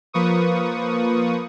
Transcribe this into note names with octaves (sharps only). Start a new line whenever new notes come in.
F3 A#3 B4 C#6 D#6